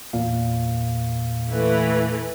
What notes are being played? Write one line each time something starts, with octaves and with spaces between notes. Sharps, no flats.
E2 A#2 F5
E3 A3 B4